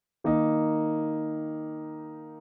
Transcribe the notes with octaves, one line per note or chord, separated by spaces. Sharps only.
D#3 A#3 D#4